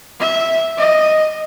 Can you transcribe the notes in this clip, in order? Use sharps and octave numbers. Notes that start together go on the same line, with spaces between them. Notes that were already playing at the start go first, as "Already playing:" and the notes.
E5
D#5